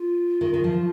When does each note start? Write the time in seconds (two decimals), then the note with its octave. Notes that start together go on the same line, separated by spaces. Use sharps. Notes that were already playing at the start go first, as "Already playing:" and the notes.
Already playing: F4
0.41 D#3
0.54 D#3
0.64 F3